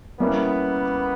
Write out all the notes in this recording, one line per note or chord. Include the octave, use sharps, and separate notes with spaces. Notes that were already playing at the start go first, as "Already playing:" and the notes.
G3 A#3 B3 C#4 E4